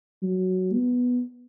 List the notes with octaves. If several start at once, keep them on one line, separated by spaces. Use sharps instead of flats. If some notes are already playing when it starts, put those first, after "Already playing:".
F#3
B3